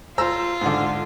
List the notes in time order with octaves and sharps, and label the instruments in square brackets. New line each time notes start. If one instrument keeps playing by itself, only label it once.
[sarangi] F4 [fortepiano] C5 A#5 E6
[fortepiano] G#2 D3